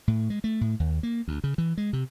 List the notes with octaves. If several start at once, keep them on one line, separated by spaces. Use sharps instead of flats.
A2
G#3
A3
A2
D#2
A#3
D2
C#3
E3
G#3
C3